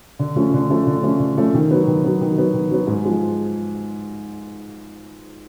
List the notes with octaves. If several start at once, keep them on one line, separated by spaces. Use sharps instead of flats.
D3
F3 A3 C#4
D3
F3 A3 C#4
D3
F3 A3 C#4
D3
F3 A3 C#4
D#3
F#3 B3
D#3
F#3 B3
D#3
F#3 B3
D#3
F#3 B3
G#2
F3 G#3